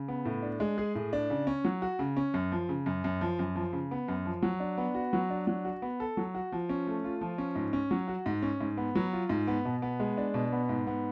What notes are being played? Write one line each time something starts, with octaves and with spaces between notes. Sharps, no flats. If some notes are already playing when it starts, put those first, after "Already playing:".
Already playing: C#3
B3
A2
D4
G#3
G#4
A2
D4
C#3
C#4
F#3
F#4
C#3
C#4
F#2
F3
C#3
F#2
F#2
F3
F#2
F3
C#3
B3
F#2
F3
F#3
D4
B3
F#4
F#3
D4
F#3
F#4
B3
A4
F#3
F#4
F3
C#4
A3
F4
F3
C#4
G#2
C#4
F#3
F#4
G#2
C#4
G#2
B3
F#3
F4
G#2
B3
B2
B3
G#3
D4
B2
B3
G#2
B3